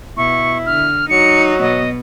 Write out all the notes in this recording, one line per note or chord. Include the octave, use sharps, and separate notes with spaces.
B2 E4 C#6
D3 F6
F#3 D#4 C#7
B2 B3 D#5